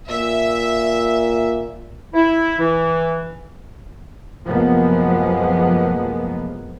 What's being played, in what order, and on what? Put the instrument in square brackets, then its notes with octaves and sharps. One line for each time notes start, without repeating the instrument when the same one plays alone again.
[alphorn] A#2 [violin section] E5
[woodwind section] E4
E3
[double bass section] F#2 C3 F3 G#3 A#3 B3